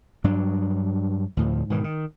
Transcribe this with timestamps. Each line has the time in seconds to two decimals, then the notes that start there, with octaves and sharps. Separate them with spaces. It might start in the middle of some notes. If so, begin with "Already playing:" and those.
0.24 G2 F#3 D4
1.37 D2 A2 F3
1.70 G#2 B2 D#3 E3
1.84 D#3